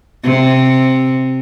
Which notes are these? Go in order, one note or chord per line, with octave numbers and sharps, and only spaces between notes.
C3